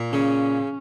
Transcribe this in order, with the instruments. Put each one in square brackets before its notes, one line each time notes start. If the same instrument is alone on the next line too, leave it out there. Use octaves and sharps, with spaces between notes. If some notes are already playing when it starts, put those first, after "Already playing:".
Already playing: [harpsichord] A#2
[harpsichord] C#3 [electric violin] C#4